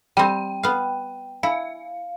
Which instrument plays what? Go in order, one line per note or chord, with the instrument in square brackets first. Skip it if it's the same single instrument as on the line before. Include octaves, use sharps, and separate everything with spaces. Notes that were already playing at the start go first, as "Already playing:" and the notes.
[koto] G3 C4 [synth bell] G5
[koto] B3 F5
[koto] E4 [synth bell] F5